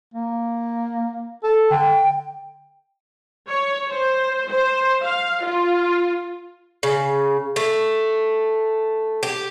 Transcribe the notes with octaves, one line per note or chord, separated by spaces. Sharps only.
A#3
A4
D3 G5
C#5
C5
C5
F5
F4
C#3
A3
G4